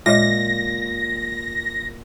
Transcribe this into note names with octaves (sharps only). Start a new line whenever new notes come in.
A#2 G#3 C#5 D#5 A#6